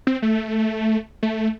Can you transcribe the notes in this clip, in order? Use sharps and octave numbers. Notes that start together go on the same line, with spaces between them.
C4
A3
A3